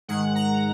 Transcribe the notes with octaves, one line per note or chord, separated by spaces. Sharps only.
G#2 D#3 G#3 F#5
A#5